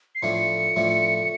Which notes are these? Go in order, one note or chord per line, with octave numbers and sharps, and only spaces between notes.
C7
A2 F3 A3 D4 C#7
A2 F3 A3 D4